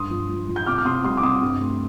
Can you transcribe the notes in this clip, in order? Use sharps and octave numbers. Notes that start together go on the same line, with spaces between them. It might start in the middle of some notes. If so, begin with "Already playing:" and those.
Already playing: G2 C6 D#6
F3
F3
F3
G6
C3 D6 F6
F6
C3 C6 D#6
G3 C6 D#6
D6
C3 C6 D#6
G2
A3